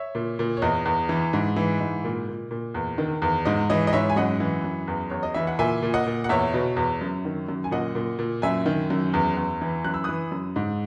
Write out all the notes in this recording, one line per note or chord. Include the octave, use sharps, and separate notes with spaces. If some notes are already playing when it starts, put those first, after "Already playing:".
Already playing: C#5 E5
A#2
A#2
C#5
E2 D#5
E2
E3
G#2
E3
G#2
A#2
A#2
A#2
E2
D#3
E2
G#2 D#5
E3 D#5
D#5
G#2 C#5 E5
G#5
F#2 D#5 F#5
E3
F#2
E2
E2 C#5
D#5
E3 E5
F#5
A#2 E5 G#5
A#2
D#5 F#5
A#2
F#5
E2 C#5 E5
B2
E2
F#2
D#3
F#2
G#5
A#2 D#5 F#5
A#2
A#2
F#2 E5 G#5
D#3
F#2
E2
E2
E3
F#2 F#6
E6
E3 D#6 F#6
F#2
G#2